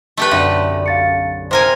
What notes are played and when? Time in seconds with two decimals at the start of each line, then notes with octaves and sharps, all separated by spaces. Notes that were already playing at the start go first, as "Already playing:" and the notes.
0.17 A3 G4 B4
0.31 B1 F#2 D3 E5
0.86 F5 A6 C#7
1.51 C3 A#4 C5 G#5